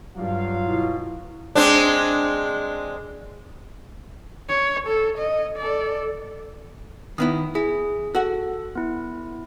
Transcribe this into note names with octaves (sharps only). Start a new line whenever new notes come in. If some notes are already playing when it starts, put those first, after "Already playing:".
G2 F#3 F4 F5
B2 E4
G#3 C4 D4
C#5
A4
D#5
A4 D5
D#3 B3 E4 D#6
E4 G#4
F#4 A4 F#5
B3 E4